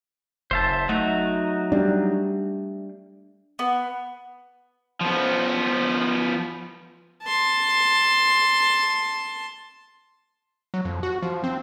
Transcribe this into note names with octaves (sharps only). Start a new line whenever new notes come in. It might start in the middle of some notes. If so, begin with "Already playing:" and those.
F#1 C5 E5 A5
F#3 A3 D#4 F#4
G3 D4
B3
F3 B3
A5 C6
F#3
F2
F#4
F3
C4